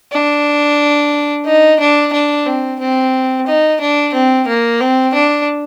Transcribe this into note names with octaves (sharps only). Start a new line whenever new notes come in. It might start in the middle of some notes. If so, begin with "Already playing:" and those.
D4
D#4
D4
D4
C4
C4
D#4
D4
C4
A#3
C4
D4